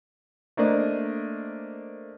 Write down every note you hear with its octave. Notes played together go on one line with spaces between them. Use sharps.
A3 A#3 D4 C5 D5 D#5